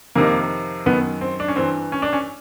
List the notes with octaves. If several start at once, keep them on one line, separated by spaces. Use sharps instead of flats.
F2 C3 D#3 A#3
F#2 D#3 B3
C4
D4
C#4
G2 E3 C4
C#4
D4
C#4